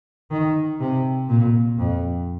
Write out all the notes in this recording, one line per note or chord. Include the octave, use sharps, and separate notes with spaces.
D#3
C3
A#2
F2